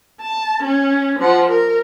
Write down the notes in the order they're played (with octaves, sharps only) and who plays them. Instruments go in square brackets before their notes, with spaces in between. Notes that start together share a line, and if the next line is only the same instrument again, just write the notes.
[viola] A5
C#4
F3 F#5
A#4